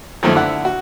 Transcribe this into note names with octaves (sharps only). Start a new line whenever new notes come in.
F#2 D#3 F3 A3 A#3 D#4
D3 E4 F#5
F#4